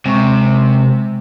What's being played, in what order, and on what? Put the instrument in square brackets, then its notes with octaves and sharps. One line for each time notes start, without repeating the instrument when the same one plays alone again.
[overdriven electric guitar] C3 [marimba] G#3 C#6